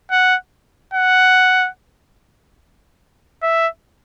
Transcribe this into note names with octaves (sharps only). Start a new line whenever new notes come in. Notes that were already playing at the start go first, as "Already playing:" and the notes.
F#5
F#5
E5